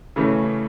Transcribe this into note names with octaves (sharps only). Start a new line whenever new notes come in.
C#3 E3 A3 C#4